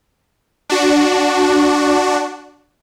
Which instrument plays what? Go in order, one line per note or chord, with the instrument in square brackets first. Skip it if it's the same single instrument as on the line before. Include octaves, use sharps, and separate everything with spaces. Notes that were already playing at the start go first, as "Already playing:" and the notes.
[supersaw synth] D4 F#4